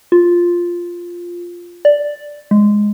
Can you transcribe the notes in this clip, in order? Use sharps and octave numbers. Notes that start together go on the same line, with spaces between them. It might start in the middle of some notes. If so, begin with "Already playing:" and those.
F4
D5
G#3